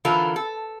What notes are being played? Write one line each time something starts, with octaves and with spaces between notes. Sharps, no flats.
D3 E3 F4 A4 A#4
A4